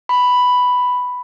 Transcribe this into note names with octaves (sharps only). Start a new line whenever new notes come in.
B5